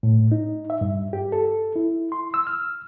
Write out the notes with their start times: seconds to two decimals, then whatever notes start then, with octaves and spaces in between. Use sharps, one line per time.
0.03 A2
0.32 D#4
0.70 E5
0.81 G2
1.13 G4
1.32 A4
1.76 E4
2.12 C6
2.34 E6
2.47 F6